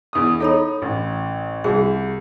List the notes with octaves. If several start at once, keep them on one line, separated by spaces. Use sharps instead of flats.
E2 D#6
D#4 A4 C#5 B5
A1
C2 F#4 G#4